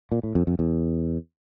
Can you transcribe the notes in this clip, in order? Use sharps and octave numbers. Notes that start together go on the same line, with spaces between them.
A#2
A2
F2
F2
E2